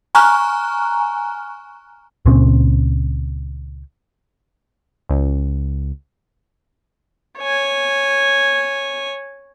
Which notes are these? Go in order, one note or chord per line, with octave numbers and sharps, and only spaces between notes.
G#5 A#5 C#6 F6 F#6
C#2 A#2 C4 C#4
C#2
C#5 G#5